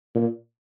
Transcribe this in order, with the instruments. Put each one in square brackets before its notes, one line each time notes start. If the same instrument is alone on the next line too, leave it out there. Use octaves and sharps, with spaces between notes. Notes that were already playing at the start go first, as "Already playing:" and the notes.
[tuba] A#2